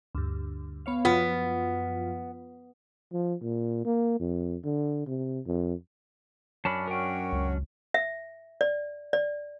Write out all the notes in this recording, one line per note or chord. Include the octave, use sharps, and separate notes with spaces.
D2 G2
B3 C#5 F5
F#2 F3 B3 F4
F3
A#2
A#3
F2
D3
C3
F2
F#2 C#4 D4 A5 B5
F#4 A#4 C#5 G5
C#2
E5
D5
D5